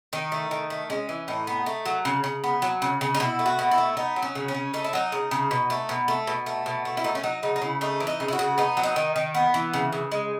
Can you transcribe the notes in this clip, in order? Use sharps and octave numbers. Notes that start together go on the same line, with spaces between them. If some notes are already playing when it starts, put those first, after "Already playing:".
D#3 D#4
A3
D#3
A3
G#3 C#4
E3
A2 D#4
B3
A3
F#3
C#3
C#3
B3
F#3
C#3
C#3
D#4
B2 E4
A3
F#4
B2
E4
A3
B3 D#4
F#3
C#4
C#3
C#4
C#3
A3 D#4
E4
F#3 D#4
C#3
C#3
B2
A3
B2
A3
B2
A3
B2
A3
E4
A3 D#4
C#4
F#3 D#4
C#3 D#4
D#4
C#3 E4
A3 D#4
E3
D#4
C#3
E4
F#4
C#3
B3 D#4
F#3
D#4
D#3
D#3
B3
E3
C#3
C#3
G#3